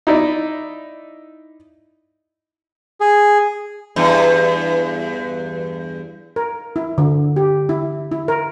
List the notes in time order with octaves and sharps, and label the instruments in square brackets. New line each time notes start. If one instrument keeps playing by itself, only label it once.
[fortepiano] D#4 E4 D5 D#5
[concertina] G#4
[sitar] E2 G2
[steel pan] A#4
E4
D3
G4
E4
E4
A#4